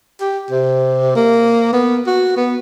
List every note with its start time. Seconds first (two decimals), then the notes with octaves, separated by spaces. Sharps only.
0.20 G4
0.51 C3
1.16 A#3
1.73 B3
2.07 F#4
2.37 B3